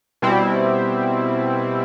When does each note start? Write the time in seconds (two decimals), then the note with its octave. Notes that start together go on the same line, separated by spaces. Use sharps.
0.22 B2 G3 C4 E4